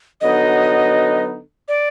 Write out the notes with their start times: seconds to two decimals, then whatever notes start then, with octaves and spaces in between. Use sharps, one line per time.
0.21 D3 F#3 B3 D#4 D#5
1.68 D5